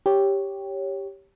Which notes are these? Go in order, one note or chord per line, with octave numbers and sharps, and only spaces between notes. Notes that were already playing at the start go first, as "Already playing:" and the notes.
G4 C#5